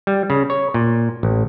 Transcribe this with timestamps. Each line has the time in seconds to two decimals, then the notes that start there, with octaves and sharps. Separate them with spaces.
0.07 G3
0.30 C#3
0.50 C#5
0.74 A#2
1.23 A1